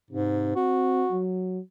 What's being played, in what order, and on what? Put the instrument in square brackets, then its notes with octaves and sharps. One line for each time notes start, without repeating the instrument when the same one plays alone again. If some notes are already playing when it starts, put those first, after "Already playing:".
[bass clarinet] G#2 [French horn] C3
[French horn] C4 [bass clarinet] F#4
[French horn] F#3